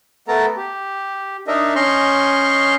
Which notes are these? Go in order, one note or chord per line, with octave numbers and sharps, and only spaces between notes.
A3 B3 A4 A#4 A5 A#5
G4
D4 D#4 A#4 D#5 E5
C#4 D#5 C6 C#6 F6 G6